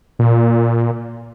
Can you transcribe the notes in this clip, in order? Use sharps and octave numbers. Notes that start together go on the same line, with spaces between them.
A#2